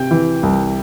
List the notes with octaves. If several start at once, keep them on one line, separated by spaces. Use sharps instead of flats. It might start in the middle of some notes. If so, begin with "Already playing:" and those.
Already playing: C3 G5
E3
C2